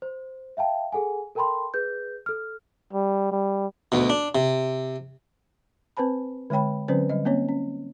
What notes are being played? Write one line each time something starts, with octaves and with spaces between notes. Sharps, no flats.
C5
E5 F5 G5 A5
G#4 A4 F#5 G#5
A4 A#4 G5 A5 B5 C6
G#4 B4 G6
A4 F6
G3
G3
D2 B2
D4
C3
C4 B4 C5 A5 B5
D3 G#3 C#5 G5 B5
D3 F#3 C4 C#4 B4 C5
D3 G3 D#5
A#3 C4 C#4 C#5
C#4